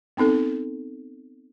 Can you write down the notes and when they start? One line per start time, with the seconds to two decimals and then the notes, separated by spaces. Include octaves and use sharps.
0.17 B3 C4 D#4 A4